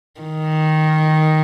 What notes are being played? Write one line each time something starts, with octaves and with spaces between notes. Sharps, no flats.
D#3